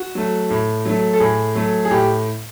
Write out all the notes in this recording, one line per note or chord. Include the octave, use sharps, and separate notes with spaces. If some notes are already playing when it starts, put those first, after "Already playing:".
Already playing: F#4
F#3 A3
A2
F#3 A3
A4
A2 G#4
F#3 A3
G#4
A2 G4